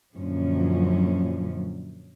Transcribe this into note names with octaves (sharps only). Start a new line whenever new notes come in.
F#2 A#2 D3 F3 F#3 C#4